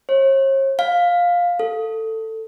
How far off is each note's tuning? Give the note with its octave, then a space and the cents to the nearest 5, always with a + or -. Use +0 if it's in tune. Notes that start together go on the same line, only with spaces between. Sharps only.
C#5 -45
F5 +10
A4 +15